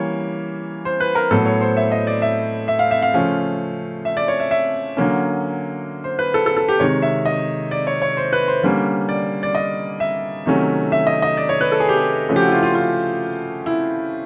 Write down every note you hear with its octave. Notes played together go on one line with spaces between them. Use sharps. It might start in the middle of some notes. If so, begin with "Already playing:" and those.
Already playing: E3 G3 A#3 C#4 C#5
C5
B4
A#4
A2 F#3 B3 A4
C#5
C5
E5
D#5
D5
E5
E5
F5
E5
F5
C#3 F3 A3 C#4 F5
E5
D5
C#5
E5
E5
D3 F#3 A#3 C#4
C5
B4
A4
A4
A4
G4
C3 D#3 G#3 C#5
E5
D#5
D5
C#5
C#5
C5
B4
C5
D3 G3 A#3 C#4
D5
D5
D#5
E5
C3 D#3 F#3 A3 C#4
E5
D#5
D#5
D5
C#5
B4
A4
G#4
G4
G#4
C#3 F3 A3 C#4
G4
F#4
E4
F4
F4
F4
E4